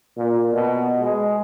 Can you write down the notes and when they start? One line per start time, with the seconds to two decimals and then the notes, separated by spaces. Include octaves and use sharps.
0.17 A#2
0.53 B2
1.02 G#3